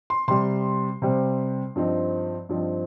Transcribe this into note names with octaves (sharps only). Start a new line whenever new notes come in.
C6
C3 G3 C4 C6
C3 G3 C4
G2 F3 C4 D#4
G2 F3 C4 D#4